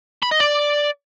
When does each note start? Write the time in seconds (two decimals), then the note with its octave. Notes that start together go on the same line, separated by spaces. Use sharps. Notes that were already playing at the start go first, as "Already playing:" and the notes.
0.23 B5
0.32 D#5
0.40 D5